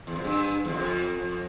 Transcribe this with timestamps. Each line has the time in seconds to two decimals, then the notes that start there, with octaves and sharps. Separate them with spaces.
0.07 E2
0.16 F2
0.24 G2
0.65 E2
0.73 F2